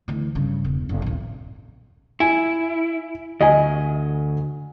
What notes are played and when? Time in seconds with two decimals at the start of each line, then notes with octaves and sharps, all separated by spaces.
0.08 D2 E3
0.35 G2 C#3
0.64 E1
0.89 F#1
1.02 D#1 A#1
2.20 E4 G#5
3.41 D2 D#5 G#5